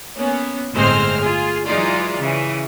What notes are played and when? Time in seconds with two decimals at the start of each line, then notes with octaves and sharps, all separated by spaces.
0.16 A#3 B3 C#4
0.74 G1 A2 G#3 C4 C5 F6
1.21 F4 G#4
1.66 E3 F#3 G#3 D#4 F4 D5
2.18 C#3 E3